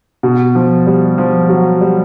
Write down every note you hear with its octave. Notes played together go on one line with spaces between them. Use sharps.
B2
F3
G3
F3
F#3
G3